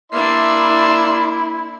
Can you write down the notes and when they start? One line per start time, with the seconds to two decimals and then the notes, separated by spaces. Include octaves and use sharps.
0.12 A#3 D4 E4 D5 E5 C6